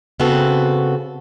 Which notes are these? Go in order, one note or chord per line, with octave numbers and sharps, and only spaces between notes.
C#3 B3 C4 F#4 A4